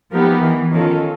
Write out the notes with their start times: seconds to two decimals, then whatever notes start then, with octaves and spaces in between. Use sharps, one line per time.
0.11 F3 B3 D#4 G4 A#4
0.42 E3
0.73 D#3 C#4 F4 A4